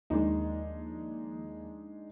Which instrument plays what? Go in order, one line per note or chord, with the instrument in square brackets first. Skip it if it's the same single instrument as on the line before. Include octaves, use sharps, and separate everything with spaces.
[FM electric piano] D#2 F3 A#3 [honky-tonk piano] G#3 D4 D#4